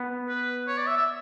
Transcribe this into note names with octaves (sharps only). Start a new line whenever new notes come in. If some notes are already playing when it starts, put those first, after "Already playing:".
Already playing: B3
B4
C#5
D5
E5
E5